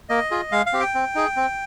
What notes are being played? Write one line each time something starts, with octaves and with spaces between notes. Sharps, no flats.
A#3 D#5
F4 G#4
G#3 F5
F5
C4 G4
G5
C4
D#4 G#4
C4